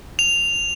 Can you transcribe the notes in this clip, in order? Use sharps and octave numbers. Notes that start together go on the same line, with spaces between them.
F7